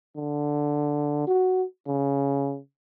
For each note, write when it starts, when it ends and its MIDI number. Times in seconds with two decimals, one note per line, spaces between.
0.16 1.27 50
1.27 1.64 66
1.87 2.58 49